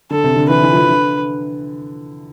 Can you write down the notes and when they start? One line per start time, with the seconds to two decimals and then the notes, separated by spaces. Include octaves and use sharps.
0.11 D3 A4
0.24 C3
0.36 D3
0.49 E3 B4
0.63 E3
0.70 F3
0.76 E3
0.88 D3